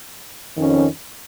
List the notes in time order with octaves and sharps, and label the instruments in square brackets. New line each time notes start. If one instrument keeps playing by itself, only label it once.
[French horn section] F2 D#3 C#4